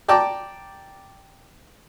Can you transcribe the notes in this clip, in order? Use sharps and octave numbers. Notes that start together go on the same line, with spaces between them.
D5 G5 A5 A#5 D6